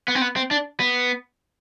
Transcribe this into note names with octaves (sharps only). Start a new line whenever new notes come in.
B3
C4
B3
C4
D4
B3